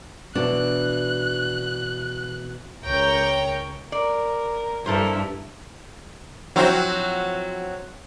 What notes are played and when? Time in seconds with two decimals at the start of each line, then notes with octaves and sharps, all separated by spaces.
0.35 B2 E3 D4 F#6
2.85 C#2 A#4 C#5 G5 A#5 G6
3.92 A#4 D5
4.86 G2 E4 A4 A#4 C5
6.56 F3 F#3 C4 E4 F#4